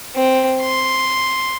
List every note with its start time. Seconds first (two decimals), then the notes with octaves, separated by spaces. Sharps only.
0.15 C4
0.61 C6